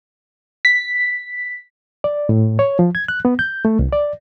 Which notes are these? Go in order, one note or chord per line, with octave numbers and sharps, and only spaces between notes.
B6
D5
A2
C#5
F3
G#6
F#6
B3
G6
A3
C2
D5